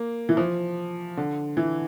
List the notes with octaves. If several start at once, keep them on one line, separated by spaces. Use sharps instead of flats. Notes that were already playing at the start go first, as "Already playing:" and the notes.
Already playing: A#3
E3
F3
D3
E3